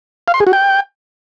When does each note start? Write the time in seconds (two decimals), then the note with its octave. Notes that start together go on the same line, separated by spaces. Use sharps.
0.28 F5
0.34 C6
0.40 G#4
0.47 F#4
0.53 G5